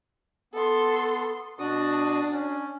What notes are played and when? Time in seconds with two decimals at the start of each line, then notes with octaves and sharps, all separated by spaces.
0.54 B3 A4 C6
1.59 B2 D4 F#4 D#6
2.32 C#4